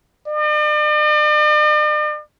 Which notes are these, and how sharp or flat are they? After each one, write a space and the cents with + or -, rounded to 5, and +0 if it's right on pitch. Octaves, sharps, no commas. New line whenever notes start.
D5 +45